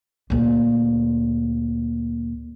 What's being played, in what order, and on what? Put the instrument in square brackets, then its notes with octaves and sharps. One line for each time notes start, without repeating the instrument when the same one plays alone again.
[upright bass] D2 A#2